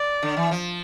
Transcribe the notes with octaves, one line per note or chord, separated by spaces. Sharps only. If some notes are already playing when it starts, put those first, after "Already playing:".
Already playing: D5
D3
E3
F3